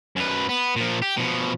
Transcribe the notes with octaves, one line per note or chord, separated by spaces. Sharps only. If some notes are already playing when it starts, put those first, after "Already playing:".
F#2 B4
B3
A#2 F3
G4
B2 F3